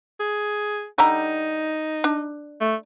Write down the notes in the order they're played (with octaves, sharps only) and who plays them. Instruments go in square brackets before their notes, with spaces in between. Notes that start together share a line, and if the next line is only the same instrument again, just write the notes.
[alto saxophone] G#4
[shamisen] D3 G3 A#5 [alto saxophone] D#4
[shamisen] D4
[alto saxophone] A3